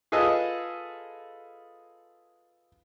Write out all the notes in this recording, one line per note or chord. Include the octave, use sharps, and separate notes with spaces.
F4 G#4 A4 B4 D#5